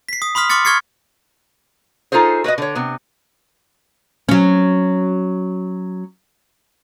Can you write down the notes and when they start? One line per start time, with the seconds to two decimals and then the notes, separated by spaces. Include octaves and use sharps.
0.09 B6 C7
0.22 D#6
0.35 B5 C6 D#6 F6 B6
0.49 C6 D6 F6 A6 C#7
0.65 C#6 F6 G#6 A6 C7 C#7
2.12 D#4 F4 G#4 A4 C5
2.44 F#4 B4 C#5 D#5
2.58 D3 C#5
2.75 C3 B3
4.29 F#3 C#4